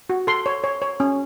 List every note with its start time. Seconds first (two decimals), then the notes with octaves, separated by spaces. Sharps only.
0.10 F#4
0.27 A4 C6
0.46 C#5
0.64 C#5
0.82 C#5
1.00 C#4